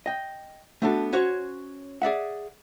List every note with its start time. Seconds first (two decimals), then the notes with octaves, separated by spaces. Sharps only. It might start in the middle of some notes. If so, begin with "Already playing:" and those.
0.06 D#5 G5
0.82 A3 B3 D4 F#4 A4
1.13 C#4 F#4 C5 C#5
2.02 G#4 D5 E5 F#5